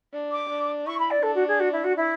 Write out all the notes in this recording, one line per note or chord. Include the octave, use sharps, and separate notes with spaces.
D4
D6
D4
E4 C#6
B5
D5
D4 A4
F#4
G#4
F#4
E4
F#4
E4